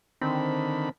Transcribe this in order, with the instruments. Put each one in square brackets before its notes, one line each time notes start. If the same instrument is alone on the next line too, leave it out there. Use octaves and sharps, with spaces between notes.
[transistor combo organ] D3 D#3 B5 [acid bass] C4